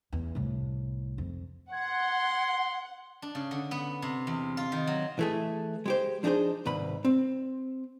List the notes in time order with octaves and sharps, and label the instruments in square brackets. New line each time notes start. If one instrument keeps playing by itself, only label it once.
[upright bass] E2
C2 A2
F2
[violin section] F#5 [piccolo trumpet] C6 [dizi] G#6
[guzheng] D4
C#3
D3
B3
C3
E2
F4
D#3
F#3
[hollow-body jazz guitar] E3 A3 G#4
G#3 G4 C5
F3 D4 D#4 G4 G#4 C5
C2 G#2 D#3 B4 B5
C4